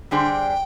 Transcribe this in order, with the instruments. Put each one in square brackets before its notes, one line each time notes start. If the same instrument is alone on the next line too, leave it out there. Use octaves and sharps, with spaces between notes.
[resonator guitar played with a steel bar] D3 G3 D4 G#4 C5 [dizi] G5